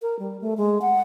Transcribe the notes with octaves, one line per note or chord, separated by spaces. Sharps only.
A#4
G3
A3
G#3
F#5